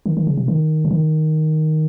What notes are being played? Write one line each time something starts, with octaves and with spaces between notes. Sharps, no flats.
D#3
D#3
C#3
C3
D#3
C#3
D#3